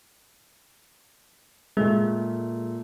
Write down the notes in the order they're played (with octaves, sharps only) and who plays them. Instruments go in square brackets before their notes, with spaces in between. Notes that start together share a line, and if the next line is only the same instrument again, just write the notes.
[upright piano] A#2 A3 [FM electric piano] G#3